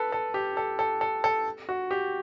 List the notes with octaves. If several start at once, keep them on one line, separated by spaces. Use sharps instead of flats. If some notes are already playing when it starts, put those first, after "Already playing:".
Already playing: A4 B4
A4
G4
A4
A4
A4
A4
F#4
G4